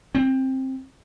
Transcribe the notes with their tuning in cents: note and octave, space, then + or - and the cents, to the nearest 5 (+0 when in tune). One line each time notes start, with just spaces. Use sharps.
C4 +15